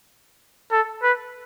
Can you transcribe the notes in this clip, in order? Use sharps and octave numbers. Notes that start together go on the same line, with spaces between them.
A4
B4